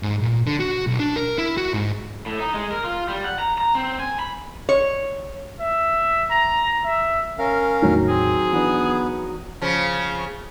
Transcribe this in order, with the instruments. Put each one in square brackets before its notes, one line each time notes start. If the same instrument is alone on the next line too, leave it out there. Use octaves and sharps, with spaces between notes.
[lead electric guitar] G#2
A#2
D3
F#4
B1
D4
A#4
E4
F#4
G#2
[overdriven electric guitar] A2
D#4
G#3
A#4
F4
G3
F#5
A#5
A#5
C4
G#5
B5
[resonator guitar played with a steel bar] C#5
[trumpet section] E5
A#5
E5
[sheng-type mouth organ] C#4 A#4 F5
[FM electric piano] E2 A2 [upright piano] D#3 F#3
[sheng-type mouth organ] C4 [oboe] G#4
[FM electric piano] E3 D4 [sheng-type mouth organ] B3
[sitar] C#3 F3